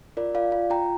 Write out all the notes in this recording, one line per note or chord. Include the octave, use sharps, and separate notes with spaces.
F4 A#4 D5
F4 D5 F5
F4
F4 G5 A#5